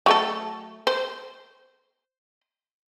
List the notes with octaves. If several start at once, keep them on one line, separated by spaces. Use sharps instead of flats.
F#3 A3 A4
C5